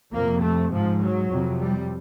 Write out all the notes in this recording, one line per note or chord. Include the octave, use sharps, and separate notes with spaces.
F2 C3 A#3
A3
G#2 F3
F#3
F2 C3
G3